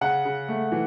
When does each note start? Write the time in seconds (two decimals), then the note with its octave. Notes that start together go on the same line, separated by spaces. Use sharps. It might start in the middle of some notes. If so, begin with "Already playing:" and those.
0.01 C#3 F#5
0.25 C#3
0.49 A3
0.72 E3